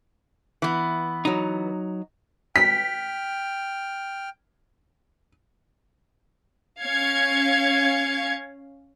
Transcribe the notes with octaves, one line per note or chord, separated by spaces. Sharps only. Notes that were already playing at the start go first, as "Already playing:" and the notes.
E3 B3
F#3 D#4
G5 F6 B6
C#4 F5 G#6 C#7